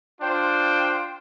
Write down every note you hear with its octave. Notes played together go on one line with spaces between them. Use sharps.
D4 F4 C5 G5